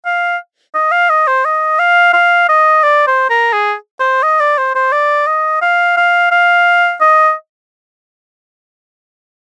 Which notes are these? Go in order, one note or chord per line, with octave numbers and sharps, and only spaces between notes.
F5
D#5
F5
D#5
C5
D#5
F5
F5
D#5
D5
C5
A#4
G#4
C5
D#5
D5
C5
C5
D5
D#5
F5
F5
F5
D#5